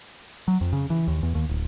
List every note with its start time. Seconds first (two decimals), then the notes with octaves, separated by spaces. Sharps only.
0.48 F#3
0.61 F2
0.73 C#3
0.90 E3
1.07 D#2
1.23 E2
1.35 D#2
1.49 D1